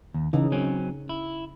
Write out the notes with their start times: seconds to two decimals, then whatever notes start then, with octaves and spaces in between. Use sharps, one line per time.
0.14 D#2
0.33 C#3 E3 D#4
0.52 F#3 C4 C#4
1.09 E4